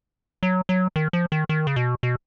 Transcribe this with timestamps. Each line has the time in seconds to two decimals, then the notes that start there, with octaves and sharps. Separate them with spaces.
0.43 F#3
0.69 F#3
0.96 D#3
1.13 F3
1.32 D#3
1.49 D#3
1.67 C#3
1.76 B2
2.03 B2